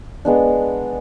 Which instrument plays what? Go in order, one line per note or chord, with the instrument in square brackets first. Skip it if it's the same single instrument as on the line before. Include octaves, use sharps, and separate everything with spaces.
[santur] G#3 B3 D4